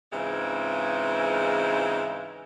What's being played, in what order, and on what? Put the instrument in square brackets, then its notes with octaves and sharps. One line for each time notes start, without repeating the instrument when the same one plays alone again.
[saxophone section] G#2 C#3 E3 G#3 C4 F4